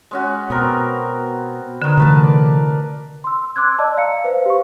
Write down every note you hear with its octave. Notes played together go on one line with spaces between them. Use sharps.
G#3 C#4 F#4
B2 B3 C4 A#4
D3 D#3 B4
C3 E3 A3 A#4 B4 A5
D5
C6 E6
C6 D6 E6 F#6 G#6
D5 D#5 A5 E6
F5 A#5 C#7
B4 C5 F5
G4 C5 C#6